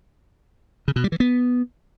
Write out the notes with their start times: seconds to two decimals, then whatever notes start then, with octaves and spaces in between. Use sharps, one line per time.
0.88 C#3
0.96 B2
1.04 G3
1.12 E3
1.20 B3